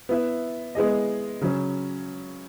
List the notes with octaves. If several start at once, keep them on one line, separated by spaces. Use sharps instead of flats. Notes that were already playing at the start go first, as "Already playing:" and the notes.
B3 E4 B4 E5
G#3 B3 E4 G#4 D#5
C#3 F#3 C#4